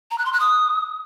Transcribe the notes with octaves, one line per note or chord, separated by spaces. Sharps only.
A#5
F#6
C6
F#6
D#6